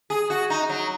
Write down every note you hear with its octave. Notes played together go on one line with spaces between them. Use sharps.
G#4
F#4
D#4
F#3